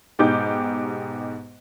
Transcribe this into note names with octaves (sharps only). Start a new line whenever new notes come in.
G#2 B2 D#4 G4 D6 G6